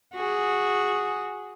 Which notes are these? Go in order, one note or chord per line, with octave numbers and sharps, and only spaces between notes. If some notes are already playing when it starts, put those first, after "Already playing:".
F#4 G#4